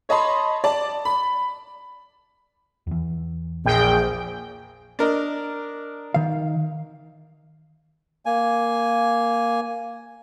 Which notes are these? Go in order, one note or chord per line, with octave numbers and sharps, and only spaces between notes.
C#5 D#5 A5 B5 C6
D5 A5
B5
E2 E3
A#1 G#4 G5
D4 A#4 D#5
D#3 F5
A#3 G#5